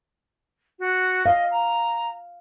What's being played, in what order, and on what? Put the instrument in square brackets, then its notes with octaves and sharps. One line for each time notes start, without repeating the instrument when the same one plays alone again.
[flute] F#4
[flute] D#5 [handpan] F5
[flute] A#5